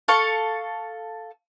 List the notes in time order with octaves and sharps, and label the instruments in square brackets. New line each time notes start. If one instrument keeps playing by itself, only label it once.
[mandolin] A4 F5 C#6